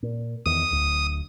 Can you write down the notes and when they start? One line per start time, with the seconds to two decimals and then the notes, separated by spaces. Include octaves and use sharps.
0.03 A#2
0.46 E2 D#3 D#6
0.71 D1 D2